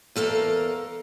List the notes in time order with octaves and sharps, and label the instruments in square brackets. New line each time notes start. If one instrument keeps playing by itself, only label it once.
[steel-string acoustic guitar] E2 A4 A#4 F5